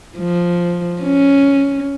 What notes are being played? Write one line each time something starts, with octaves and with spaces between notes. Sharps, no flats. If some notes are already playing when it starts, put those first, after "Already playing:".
F3
C#4